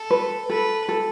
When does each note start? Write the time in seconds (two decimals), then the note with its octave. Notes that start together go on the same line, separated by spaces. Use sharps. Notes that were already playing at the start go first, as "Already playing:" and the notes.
Already playing: A4
0.10 B4
0.49 A4 B4
0.89 A4